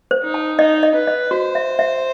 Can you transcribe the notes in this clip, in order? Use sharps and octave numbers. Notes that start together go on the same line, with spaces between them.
C5
D#4
A5
D#4 D#5
D#5
B4
D#5
F#4 C5
E5
E5